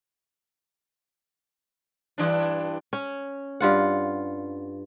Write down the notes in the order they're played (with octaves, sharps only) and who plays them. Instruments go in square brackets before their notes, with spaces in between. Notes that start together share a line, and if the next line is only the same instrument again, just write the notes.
[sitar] G2 E3 D4
[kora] C#4
G2 F4 F#5